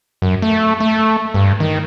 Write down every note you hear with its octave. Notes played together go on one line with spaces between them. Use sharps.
F#2
A3
A3
G2
D#3